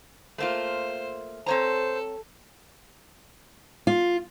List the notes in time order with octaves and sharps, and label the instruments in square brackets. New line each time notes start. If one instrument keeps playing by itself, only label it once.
[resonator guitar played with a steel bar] A3 A#3 F4 [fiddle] C5
[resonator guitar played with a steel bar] C4 C#5 A#5 [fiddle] A4 [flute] C5
[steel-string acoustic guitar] F4